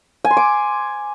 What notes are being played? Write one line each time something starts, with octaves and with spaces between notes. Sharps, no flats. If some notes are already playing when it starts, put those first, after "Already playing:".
G#5
C6
D6